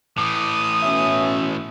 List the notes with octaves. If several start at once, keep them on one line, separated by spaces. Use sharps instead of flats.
A2 E3 D6 D#6
B2 C#4 E5